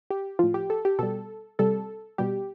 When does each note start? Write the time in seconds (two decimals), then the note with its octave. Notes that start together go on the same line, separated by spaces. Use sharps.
0.10 G4
0.39 A2 F3 F4
0.54 G4
0.70 A4
0.85 G4
0.99 B2 G3 A4
1.59 C3 G3 A4
2.18 B2 G3 G4